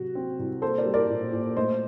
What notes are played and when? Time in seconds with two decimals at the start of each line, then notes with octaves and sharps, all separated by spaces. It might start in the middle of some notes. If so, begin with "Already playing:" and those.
Already playing: C3 F#3 F#4
0.15 C4
0.39 C2
0.62 A#3 A4 C5
0.78 A#4 D5
0.85 G3
0.94 A#4 D5
1.10 A#2
1.33 A#2
1.56 A3 C5 D#5